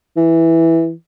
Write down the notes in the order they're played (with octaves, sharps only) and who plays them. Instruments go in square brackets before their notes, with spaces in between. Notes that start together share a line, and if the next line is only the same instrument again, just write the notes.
[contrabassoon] E3